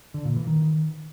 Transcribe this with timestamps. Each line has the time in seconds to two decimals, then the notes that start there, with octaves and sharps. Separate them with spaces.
0.14 D3
0.25 A#2
0.36 E3
0.47 D#3